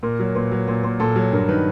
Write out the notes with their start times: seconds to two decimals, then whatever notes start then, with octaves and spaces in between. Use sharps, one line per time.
0.03 A#2 A#4
0.19 F#3
0.35 A#2 B4
0.52 F#3
0.68 A#2
0.84 A#2
1.00 A#2 A4
1.16 F#3
1.32 G2 A#4
1.49 D#3 B4